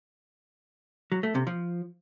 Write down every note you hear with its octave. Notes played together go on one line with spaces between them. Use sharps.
F#3
A3
C3
F3